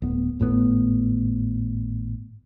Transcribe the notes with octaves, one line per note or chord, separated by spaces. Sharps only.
D1 B3
G#1 A2 C#3 B3